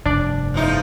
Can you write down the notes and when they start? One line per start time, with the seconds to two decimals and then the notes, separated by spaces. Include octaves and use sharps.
0.06 F1 G2 D4 D5
0.54 E2 F3 D#4